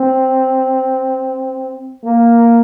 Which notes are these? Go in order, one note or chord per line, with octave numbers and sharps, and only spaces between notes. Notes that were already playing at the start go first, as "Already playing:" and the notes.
Already playing: C4
A#3